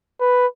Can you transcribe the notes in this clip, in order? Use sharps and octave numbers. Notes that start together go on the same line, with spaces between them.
B4